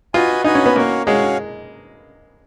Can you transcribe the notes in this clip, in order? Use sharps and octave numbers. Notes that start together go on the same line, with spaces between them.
F4 F#4 B4 D#5 G#5
D#4 F#4 B4 D#5 G#5
C#4
B3
A#3 C#4 F#4 C#5 F5
G#3 C#4 F#4 C#5 F5